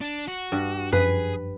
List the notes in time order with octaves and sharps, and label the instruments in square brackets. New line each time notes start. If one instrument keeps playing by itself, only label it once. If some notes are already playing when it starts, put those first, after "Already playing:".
[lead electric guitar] D4
F#4
[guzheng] G2
[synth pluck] F#2 F3 [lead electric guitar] G#4 [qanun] B4